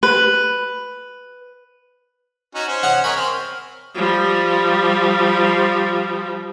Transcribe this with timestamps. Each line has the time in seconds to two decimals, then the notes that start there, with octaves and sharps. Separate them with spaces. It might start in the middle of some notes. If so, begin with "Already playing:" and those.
0.03 B4
2.55 C#4 D#4 F#4
2.68 C#4 C5
2.83 C#5 D#5 F#5
3.04 G#4 A#4 C#5 B5
3.17 C4 F6
3.95 F3 G3